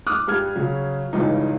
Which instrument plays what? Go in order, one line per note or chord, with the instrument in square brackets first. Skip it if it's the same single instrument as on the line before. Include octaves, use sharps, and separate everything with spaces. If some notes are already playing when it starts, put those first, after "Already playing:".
[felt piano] D6 D#6 F6 F#6
G2 G3 F6 G#6
C#3 F#3
C#2 G2 C#3 E3 D#4